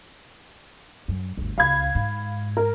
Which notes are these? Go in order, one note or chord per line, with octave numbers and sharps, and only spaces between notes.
F#2
G1 D2
C#2 F5 B5 G#6
G#2
A#4